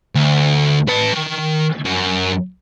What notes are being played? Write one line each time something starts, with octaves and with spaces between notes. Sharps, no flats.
D2
B4 A5
D#3
F#2